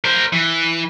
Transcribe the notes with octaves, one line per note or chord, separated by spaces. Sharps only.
A#4 C5
E3